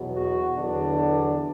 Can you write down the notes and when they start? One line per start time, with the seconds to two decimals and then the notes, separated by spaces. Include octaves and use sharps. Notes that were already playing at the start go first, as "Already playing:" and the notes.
Already playing: E2 B2 F#3 B3
0.13 F#4
0.56 E2 D3 F#3 B3 D4